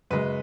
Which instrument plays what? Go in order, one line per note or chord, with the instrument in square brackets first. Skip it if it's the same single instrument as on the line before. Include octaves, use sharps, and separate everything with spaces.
[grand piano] F#2 C#3 G#3 B4